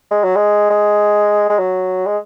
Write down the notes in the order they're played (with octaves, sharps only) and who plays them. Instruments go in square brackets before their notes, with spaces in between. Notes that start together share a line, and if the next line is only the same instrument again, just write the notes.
[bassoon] G#3
F#3
G#3
G#3
G#3
F#3
G#3